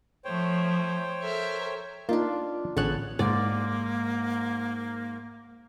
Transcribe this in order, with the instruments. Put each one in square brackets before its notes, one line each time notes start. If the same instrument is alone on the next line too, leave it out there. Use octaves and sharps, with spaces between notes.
[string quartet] F3 A3 [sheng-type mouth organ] C5 C#5 G5
[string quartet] A4 A#4 E5
[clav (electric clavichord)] A#3 D#4 [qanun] D4 F4
[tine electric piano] A1 G#4 F#6 [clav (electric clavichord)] D3 C#4 [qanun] B3 C#5 A5
[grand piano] G#2 [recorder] A#3 [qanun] D5